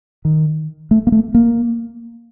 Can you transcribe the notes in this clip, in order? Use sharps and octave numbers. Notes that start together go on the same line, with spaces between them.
D#3
A3
A#3
A3
A#3